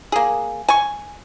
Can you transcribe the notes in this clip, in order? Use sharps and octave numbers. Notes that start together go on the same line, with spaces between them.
A#3 G#4
G#5 C#6